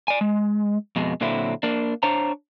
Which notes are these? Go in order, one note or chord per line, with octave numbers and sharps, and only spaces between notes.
D5 G#5
G#3
F2 B2 G#3
A#2 D3 F#3 C4 E4
A#3 D4
D4 C5 C#5 A#5